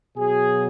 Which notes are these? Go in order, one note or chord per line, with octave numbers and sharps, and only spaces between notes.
B2 F#3 G#4